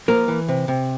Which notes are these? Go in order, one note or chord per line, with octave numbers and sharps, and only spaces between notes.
F3 A#3 A#4
E3
C3
C3